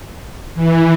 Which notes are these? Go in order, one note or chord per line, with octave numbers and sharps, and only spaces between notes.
E3